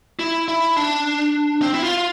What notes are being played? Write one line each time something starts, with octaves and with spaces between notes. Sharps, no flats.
E4
E4
D4
C4
E4
F4